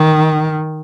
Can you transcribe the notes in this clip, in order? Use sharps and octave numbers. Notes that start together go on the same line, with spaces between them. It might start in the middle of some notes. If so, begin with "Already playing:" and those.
Already playing: D#3